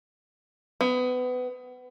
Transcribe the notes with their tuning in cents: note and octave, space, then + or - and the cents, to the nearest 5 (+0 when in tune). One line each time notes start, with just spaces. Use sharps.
B3 +25